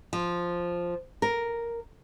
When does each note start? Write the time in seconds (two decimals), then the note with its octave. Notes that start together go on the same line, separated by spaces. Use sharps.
0.13 F3
1.22 A#4